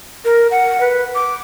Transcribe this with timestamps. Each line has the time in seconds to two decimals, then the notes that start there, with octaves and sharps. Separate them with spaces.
0.25 A#4
0.51 F#5
0.81 B4
1.15 D6